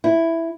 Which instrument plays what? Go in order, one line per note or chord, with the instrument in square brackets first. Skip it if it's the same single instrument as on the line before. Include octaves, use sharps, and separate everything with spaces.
[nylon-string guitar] E4